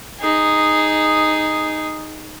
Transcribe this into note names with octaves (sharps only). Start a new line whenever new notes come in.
D#4 G#4